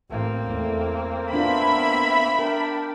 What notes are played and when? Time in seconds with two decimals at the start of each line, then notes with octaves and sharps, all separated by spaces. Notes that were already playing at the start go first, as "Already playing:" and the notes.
0.11 A1 A#3 C4
0.50 E2 A3
1.33 B3 D4 F4 E5 B5
2.39 D4 A#4 G5